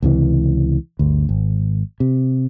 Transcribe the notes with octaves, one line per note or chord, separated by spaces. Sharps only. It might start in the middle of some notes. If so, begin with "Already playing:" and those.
C#2 C3 D#3 E3
G1 D2
G#1
C3